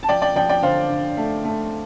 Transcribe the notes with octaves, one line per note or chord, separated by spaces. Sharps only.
A5
F3 D5 G5
D5 G5
F3 D5 G5
D5 G5
D3 C5 F5
D3
A3
A3